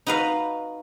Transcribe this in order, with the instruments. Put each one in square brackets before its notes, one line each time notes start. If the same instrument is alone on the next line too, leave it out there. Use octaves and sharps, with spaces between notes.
[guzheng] D#4 F#4 B4 D#5 F5